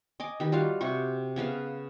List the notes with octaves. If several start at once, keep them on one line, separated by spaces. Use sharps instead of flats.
D#5 G#5 D6
D#3 G4 B4
G3 F4 F#4 F5
C3 F#4 C#6
C#3 B3 B4 F5